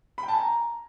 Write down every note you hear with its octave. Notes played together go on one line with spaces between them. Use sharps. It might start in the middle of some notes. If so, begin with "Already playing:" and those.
B5
G5
A5
G#5
A#5